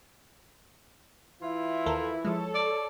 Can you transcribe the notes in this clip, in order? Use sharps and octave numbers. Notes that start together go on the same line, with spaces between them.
E3 E4 F4
D#2 A4 A#4
F3 G#3 A4 C#5
D5